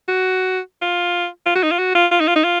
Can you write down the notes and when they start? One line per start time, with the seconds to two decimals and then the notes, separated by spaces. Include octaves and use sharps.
0.08 F#4
0.82 F4
1.46 F4
1.55 F#4
1.63 D#4
1.71 F4
1.79 F#4
1.95 F4
2.11 F4
2.20 D#4
2.28 F4
2.36 D#4
2.44 F4